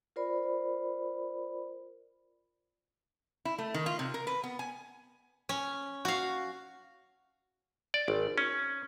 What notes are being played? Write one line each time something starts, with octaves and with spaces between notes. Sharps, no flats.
F4 A#4 C5 D5 B5
E4
A3
D#3
F4
C3
A#4
B4
B3
G#5
C#4
F#4 F5
D5
G#1
C#4